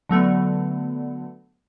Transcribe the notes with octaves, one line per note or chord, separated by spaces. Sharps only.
D3 F#3 A3 B3